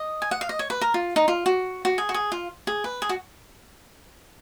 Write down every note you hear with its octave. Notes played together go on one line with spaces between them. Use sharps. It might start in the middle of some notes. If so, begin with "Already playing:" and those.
Already playing: D#5
G#5
F#5
F5
D#5
C#5
B4
A#4
F4
D#4
F4
F#4
F#4
G#4
F#4
G#4
F4
G#4
B4
G#4
F#4